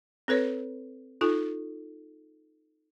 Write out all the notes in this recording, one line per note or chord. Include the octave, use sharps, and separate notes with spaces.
C4 A4 B4 C#5
D#4 F4 A4